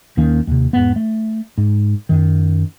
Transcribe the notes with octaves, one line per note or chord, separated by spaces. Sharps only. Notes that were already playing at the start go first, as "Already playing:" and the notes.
D#2 D#3 A#3 C#4
D#2 C3
E2 G#2 B3
A3
G#2
F#2 D#3